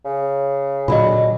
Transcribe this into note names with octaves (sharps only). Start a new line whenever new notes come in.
C#3
A#2 D3 F#3 D#5 B5